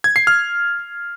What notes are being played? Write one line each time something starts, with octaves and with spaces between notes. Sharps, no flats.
G#6
C7
F6